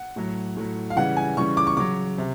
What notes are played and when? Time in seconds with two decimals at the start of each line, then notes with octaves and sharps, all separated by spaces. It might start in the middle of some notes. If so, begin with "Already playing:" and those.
Already playing: F#5
0.16 A2 F#3
0.57 A2 F#3
0.90 F5
0.96 C#3 E3 G3 F#5
1.17 G#5
1.37 C#3 E3 G3 C#6
1.57 D6
1.67 C#6
1.77 C#3 F#3 D6
2.18 C3